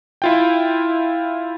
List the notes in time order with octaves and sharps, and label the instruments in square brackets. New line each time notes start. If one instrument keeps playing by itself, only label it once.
[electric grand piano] E4 F4 G5